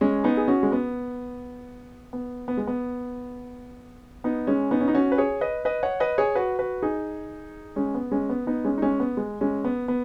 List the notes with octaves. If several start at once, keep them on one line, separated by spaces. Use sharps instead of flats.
G#3 C#4
B3 D#4
G#4
C#4 F#4
G#3
B3
B3
B3
G#3
B3
B3 D#4
G#3 C#4
B3 D#4
C#4
D#4
C#4 F#4
B4
G#4 C#5
B4 D#5
B4 D#5
C#5 F#5
B4 D#5
G#4 C#5
F#4 B4
F#4 B4
D#4 G#4
G#3 C#4
B3
G#3 C#4
B3
B3 D#4
G#3 C#4
D#4
G#3 C#4
B3
G#3
G#3 C#4
B3
B3